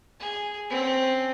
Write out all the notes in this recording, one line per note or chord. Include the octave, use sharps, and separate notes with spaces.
G#4
C4 C#4